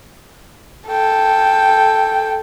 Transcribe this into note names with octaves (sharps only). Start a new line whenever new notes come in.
A4 G5